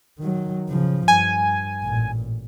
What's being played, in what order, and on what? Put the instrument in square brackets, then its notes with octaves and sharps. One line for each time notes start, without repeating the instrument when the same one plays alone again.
[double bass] D#3 F#3
C#3 F3
[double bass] G2 [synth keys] G#5
[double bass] A1 A#2